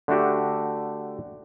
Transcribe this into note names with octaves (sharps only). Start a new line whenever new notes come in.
D3 A3 D4 F#4 G4